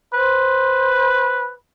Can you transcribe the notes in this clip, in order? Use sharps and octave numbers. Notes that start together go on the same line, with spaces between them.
B4 C5